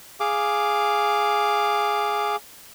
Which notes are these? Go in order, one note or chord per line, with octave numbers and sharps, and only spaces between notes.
G#4 F5 D6